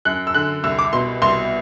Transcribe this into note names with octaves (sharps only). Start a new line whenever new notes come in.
F#2 F#6
E6
D3 F#6
C2 E6
D6
B2 C6
C2 C6